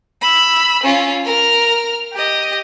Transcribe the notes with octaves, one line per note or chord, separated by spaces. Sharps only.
B5 E6
C#4 F4
A#4 F6
G4 D#5